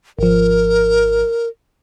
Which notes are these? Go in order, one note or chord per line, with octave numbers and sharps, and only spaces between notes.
G#1 F3 A#4